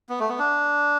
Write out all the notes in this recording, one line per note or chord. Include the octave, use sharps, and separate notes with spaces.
B3
A3
B3
D4